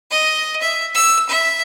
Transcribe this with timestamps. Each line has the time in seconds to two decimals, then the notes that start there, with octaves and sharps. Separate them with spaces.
0.11 D#5
0.61 E5
0.94 E6
1.29 E5